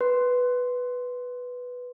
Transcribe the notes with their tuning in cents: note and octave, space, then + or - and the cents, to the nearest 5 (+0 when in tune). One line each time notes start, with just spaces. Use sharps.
B4 +0 C6 +0